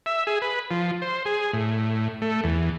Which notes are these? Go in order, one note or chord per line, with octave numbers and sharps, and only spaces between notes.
E5
G#4
B4
F3
C5
G#4
A2
A3
E2